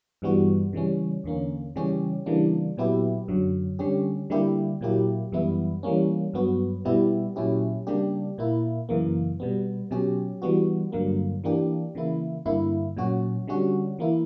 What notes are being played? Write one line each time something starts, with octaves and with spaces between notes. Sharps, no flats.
G2 E3 G3 B3 F#4
C#3 E3 G3 C#4
E2 D3 A#3 C#4
C#3 E3 G3 C#4 G4
C#3 E3 G3 A#3 D4
A#2 F#3 B3 E4 G4
F#2 D3 F#3
D3 G3 C#4 G4
D3 G3 A#3 E4 G4
A#2 F#3 A#3 E4 G4
F#2 E3 G3 B3 E4
E3 G3 A#3 C#4
G2 F#3 B3 F#4
B2 G3 B3 E4 G4
A#2 F#3 C#4 E4 G4
C#3 G3 A#3 D4 G4
A#2 A#3 E4
F#2 C#3 E3 A#3
B2 G3 B3
B2 F#3 C#4 G4
E3 G3 B3 F#4
G2 D3 F#3 A#3
E3 A#3 D4 G4
C#3 E3 A#3 E4
G2 D3 A#3 E4
A#2 F#3 C#4 F#4
D3 G3 C#4 F#4
E3 A#3 E4